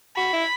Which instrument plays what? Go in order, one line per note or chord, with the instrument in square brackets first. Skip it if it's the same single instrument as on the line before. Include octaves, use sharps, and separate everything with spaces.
[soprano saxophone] F#4 [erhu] B5
[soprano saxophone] E4